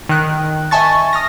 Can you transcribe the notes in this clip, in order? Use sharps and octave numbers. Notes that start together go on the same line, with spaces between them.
D#3 F#6
D#5 E5 G#5 A5 C#6 A6
D#6 F6 A#6